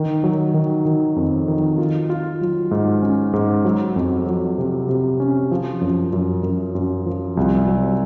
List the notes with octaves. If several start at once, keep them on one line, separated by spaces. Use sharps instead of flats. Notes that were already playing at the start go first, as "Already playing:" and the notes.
Already playing: D#3
F#3
D#3
D#3
F2
D#3
F4
F4
F#3
G#2
C#4
G#2
F#3
F2
F#3
C3
C3
C#4
F3
F#2
F#2
F#2
F#2
F3
C2
F#3